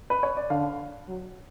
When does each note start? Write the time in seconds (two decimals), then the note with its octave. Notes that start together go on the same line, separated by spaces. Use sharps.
0.10 B4
0.23 C#5
0.37 D5
0.50 D3 F5
1.08 F#3